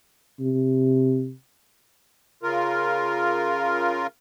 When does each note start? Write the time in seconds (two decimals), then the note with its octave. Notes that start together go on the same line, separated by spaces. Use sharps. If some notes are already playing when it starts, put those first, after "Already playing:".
0.40 C3
2.43 C#3 F4 A#4